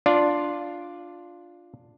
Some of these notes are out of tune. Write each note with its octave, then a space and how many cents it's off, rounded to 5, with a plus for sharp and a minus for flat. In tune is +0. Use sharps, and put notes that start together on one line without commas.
D4 +0 F4 +0 D5 +0